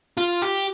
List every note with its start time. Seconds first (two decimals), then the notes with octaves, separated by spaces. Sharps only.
0.17 F4
0.42 G4